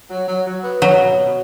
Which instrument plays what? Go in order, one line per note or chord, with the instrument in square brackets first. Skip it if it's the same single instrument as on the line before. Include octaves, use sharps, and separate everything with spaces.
[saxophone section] F#3
F#3
F#3
B3
[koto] F#3 [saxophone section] F#4
[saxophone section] B2
B2